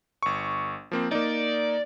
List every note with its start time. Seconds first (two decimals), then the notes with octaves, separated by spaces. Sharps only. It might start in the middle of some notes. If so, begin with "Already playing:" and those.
0.23 G1 C#6
0.91 F3 A#3 C4
1.12 A#3 D#4 D5